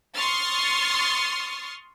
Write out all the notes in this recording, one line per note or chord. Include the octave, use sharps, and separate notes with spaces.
C6 C#6 D#6 F6 A6